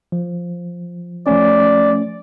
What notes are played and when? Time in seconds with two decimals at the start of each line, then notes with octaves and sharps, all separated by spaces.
0.12 F3
1.27 F3 A3 C#4 D5